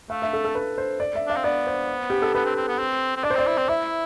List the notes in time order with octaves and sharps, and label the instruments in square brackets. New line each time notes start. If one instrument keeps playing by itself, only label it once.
[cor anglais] A3 [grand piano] F5
[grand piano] E5
A4
A4
B4
C5
D5
E5
[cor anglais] D4 [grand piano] F5
[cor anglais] C4
[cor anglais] B3 [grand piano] D5
[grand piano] C5
G4
A4
[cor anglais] B3 [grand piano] B4
[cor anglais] C4
C4
B3
C4
C4
[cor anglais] D4 [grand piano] D5
[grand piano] C5
[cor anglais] C4 [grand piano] D5
[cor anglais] E4
C4
[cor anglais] E4 [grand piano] E5